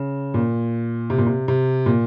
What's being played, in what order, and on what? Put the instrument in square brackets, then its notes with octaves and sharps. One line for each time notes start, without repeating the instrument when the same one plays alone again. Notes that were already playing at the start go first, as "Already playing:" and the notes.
Already playing: [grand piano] C#3
A#2
C3
A#2
C3
C3
A#2